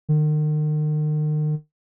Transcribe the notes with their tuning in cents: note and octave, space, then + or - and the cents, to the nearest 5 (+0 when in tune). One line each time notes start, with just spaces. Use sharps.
D#3 -40